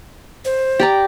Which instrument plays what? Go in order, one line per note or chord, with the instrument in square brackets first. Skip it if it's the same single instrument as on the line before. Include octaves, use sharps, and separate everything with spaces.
[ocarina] C5
[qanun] G4 D5 A#5